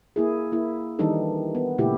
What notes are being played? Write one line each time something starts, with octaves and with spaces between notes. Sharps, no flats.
A#3 E4 G#4
A#3 E4
D#3 E3 G3 D4 D#4 A4
B3
A#2 C#3 A3 E4 G4